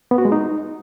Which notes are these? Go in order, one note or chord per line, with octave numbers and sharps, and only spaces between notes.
B3
F#4
G#3
D#4